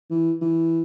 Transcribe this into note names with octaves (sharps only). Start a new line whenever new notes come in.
E3
E3